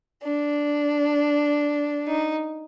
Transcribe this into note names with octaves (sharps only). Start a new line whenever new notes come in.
D4
D#4